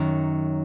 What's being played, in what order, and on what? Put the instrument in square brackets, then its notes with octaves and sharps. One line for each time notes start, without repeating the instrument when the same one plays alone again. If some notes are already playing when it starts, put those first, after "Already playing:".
Already playing: [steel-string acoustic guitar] F#2 D#3 F#3